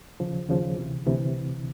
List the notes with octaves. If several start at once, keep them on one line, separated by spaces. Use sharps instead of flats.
D#2 C#3 F3
D#2 C#3 F3
D2 C3 E3
D2 C3 E3